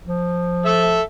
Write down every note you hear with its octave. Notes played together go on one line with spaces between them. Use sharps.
F3
A4 E5